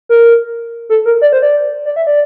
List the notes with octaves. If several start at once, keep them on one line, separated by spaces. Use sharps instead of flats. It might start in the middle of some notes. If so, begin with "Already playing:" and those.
A#4
A4
A#4
D5
C5
D5
D5
E5
D5